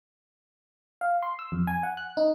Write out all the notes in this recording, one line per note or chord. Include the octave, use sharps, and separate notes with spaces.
F5
C6
E6
F2
G#5
F#5
F#6
D#4